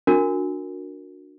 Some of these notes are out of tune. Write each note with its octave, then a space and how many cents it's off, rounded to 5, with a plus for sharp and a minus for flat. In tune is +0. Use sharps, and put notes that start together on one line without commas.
D4 +0 F#4 -30 A#4 -10